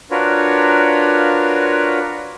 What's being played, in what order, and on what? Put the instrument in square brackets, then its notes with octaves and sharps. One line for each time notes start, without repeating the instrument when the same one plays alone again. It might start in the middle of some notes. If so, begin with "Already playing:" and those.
[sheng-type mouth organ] D4 F4 F#4 A#4 B4 C#5